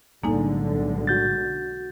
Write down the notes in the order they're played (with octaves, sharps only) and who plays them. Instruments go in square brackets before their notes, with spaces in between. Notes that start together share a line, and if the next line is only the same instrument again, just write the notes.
[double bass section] B1 D3 G#3 [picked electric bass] A2 G3 [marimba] A#3 D#4 G#5
[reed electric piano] F#4 G6 A6